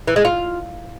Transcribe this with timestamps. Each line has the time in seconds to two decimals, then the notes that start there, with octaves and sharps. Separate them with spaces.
0.08 E3
0.16 G#3
0.25 F4